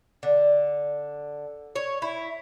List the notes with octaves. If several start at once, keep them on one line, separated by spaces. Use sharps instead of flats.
D3
C#5
E4